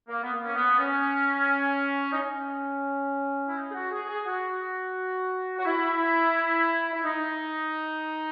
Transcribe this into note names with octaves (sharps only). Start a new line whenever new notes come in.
A#3
B3
A#3
C#4
B3
C#4
D#4
C#4
E4
D#4
G#4
F#4
G#4
G#4
F#4
F#4
E4
E4
D#4